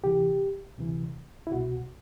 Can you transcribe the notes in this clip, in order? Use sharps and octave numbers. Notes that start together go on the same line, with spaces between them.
D2 C3 E3 G4
D2 C3 E3
E4
C2 B2 F#4